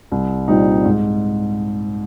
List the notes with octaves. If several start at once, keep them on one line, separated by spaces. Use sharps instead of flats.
C2
A#2 G3 C4 D#4
G#2